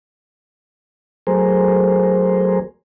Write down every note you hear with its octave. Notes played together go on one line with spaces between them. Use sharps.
F#3 A3 G#4 A#4 C5